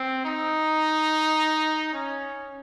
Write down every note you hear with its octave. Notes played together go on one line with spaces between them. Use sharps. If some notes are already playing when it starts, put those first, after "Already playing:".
Already playing: C4
D#4
C#4